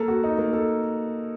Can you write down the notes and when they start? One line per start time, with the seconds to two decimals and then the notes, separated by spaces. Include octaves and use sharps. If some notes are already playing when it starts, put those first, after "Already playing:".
Already playing: A#3 A4
0.08 F#4
0.24 D#4
0.38 A#3
0.53 A4